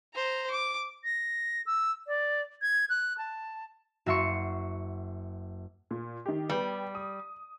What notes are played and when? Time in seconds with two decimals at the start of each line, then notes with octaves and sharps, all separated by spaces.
0.15 C5 A#5
0.51 D6
1.04 A#6
1.66 E6
2.07 D5
2.62 G#6
2.90 F#6
3.18 A5
4.06 F#1 F#4 E5 C6 C#6 C#7
5.91 A#2
6.26 D#3 G4
6.50 G3 B3 G4
6.95 D#6